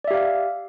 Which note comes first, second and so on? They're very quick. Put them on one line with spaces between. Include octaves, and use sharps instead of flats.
D5 E5 G4 F5